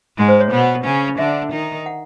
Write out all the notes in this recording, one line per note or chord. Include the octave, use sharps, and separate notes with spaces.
G#2 G#3
C5
C#5
B2 B3
C#3 C#4
D3 D4 E5
D#3 D#4
F#5